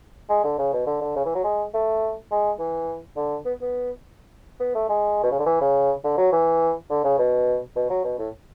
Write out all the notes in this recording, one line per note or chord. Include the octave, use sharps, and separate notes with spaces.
G#3
D3
C#3
B2
D3
D3
C#3
E3
F#3
G#3
A3
G#3
E3
D3
B3
B3
B3
A3
G#3
B2
C#3
D3
E3
C#3
D3
F#3
E3
D3
C#3
B2
B2
F#3
B2
A2